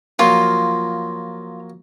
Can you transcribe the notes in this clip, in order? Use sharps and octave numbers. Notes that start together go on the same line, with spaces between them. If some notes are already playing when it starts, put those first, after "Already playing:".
F3 F#3 A#3 F4